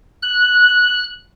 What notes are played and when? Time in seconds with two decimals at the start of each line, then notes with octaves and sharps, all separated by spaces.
0.22 F#6